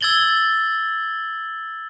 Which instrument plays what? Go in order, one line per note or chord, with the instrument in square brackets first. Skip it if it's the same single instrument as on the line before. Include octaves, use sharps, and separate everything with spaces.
[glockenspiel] E6 G#6 A6 F#7 G7